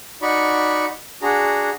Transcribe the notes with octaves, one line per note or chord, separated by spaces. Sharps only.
D#4 F#4 D5 B5 C#6
D4 F#4 G#4 A#5